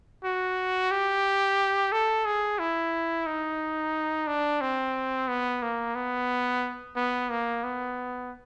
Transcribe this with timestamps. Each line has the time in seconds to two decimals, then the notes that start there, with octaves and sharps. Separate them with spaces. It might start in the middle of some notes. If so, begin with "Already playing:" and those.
0.24 F#4
0.91 G4
1.92 A4
2.26 G#4
2.59 E4
3.26 D#4
4.27 D4
4.61 C4
5.28 B3
5.62 A#3
5.95 B3
6.96 B3
7.30 A#3
7.64 B3